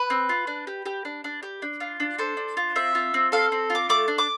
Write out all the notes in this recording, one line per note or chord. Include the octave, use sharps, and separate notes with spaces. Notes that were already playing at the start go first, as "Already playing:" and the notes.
Already playing: B4
C4
F4
D4
G4
G4
D4
D4
G4
D4
F4
D4
A4 C5
D4
F4
C4 E5
F4
C4
A4 F5
C4
F4
D6
A3 D6
D4
D6